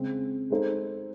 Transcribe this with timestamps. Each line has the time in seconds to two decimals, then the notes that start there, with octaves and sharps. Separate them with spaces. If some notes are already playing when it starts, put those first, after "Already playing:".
Already playing: C#3 G#3 C4
0.50 G#3 D#4 A4 C5